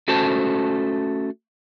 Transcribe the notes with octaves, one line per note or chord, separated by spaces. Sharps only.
A3 C#4 F#4 A4 C5 A5